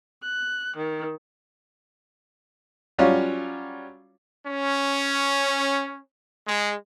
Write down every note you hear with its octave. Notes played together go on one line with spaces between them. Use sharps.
F#6
D#3
F#3 G3 C#4 F4 C#5
C#4
G#3